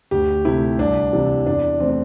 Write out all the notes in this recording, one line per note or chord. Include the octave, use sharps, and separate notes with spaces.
D2 G4
C3 A3 E4
C2 D4
C3 E3
E2 D4
E3 A3 C4
D4